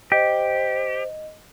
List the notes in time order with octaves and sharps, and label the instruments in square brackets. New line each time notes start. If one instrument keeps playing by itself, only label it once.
[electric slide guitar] G4 [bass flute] C5 [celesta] D#5